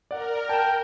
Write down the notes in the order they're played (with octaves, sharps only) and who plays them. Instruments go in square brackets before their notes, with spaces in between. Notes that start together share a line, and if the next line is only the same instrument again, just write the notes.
[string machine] A#4 [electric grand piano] D5 F#5
[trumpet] G5 [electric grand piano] A5 E7